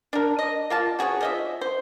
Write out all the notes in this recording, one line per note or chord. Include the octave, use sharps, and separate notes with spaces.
D4 A#4
D#5
A#3 F4 A5
F#4 G#4 A#4 C#5
F3 D#5 E5
C5